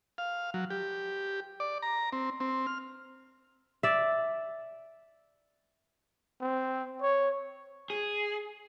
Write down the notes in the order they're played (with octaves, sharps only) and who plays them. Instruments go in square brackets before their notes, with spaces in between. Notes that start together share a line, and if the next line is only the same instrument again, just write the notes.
[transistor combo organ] F5
F#3
G4
D5
A#5
C4
C4
F6
[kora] D5 E5
[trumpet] C4
C#5
[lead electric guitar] G#4